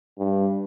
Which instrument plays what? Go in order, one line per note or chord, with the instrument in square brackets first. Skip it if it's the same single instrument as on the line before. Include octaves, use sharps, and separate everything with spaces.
[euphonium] G2